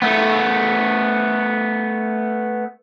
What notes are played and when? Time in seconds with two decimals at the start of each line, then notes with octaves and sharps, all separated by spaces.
0.02 A3 B3